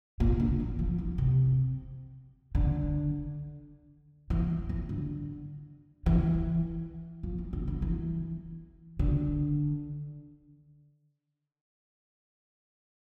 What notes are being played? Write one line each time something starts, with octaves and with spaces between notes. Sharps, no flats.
A#2
D3
E3
F3
E3
C3
D3
E3
E3
D3
E3
F3
E3
D3
D3
E3
D3